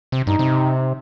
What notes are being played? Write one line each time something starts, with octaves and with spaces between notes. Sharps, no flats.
C3
G2 D#4
C3